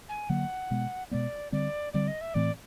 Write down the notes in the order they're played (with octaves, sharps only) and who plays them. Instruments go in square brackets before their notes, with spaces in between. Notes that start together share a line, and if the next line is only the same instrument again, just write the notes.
[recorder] G#5
[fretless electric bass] D3 F#3 A#3 [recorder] F#5
[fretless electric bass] B2 G#3 B3
[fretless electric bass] B2 G#3 B3 [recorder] D5
[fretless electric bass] D3 G3 C4 [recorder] D5
[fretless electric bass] D3 G3 C4 [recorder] D5
[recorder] D#5
E5
[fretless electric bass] A2 E3 A3 C4 [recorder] D5